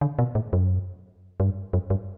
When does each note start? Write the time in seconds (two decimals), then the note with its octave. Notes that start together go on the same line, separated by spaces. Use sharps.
0.01 D3
0.19 B2
0.35 A2
0.53 F#2
1.40 G2
1.73 F#2
1.90 G2